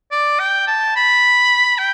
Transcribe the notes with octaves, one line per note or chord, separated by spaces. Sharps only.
D5
G5
A5
B5
G5